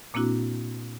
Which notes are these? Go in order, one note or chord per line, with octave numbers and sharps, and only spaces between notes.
A#2 A#3 C4 D4 E4 F#4